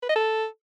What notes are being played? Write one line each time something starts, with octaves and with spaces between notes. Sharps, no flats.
B4
D#5
A4